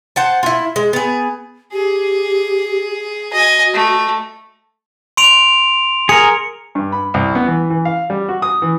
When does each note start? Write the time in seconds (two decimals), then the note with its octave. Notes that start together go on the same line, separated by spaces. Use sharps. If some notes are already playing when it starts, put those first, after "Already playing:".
0.16 C5 F#5 A5
0.43 E4 F4
0.76 G#3
0.93 B3 G#4
1.73 G4 G#4
3.33 F#4 D#5 G#5
3.73 A3
5.17 C6 D7 F7
6.09 G#4 A#4 C#7
6.75 G2
6.92 B5
7.14 C2
7.35 B3
7.47 E3
7.70 E3
7.85 F5
8.10 G3
8.28 F#4
8.42 D#6
8.62 E3